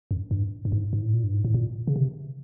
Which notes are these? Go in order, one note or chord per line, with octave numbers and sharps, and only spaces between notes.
F#2
G2
G2
G#2
G#2
A2
A#2
G2
G#2
A2
A#2
C#3
C3